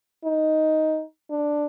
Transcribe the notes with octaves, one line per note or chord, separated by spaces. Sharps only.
D#4
D4